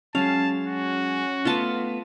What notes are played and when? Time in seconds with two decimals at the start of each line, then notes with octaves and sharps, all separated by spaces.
0.15 F#3 G#3 C#4 F5 A5
0.67 F#4
1.45 A3 B3 F4 A5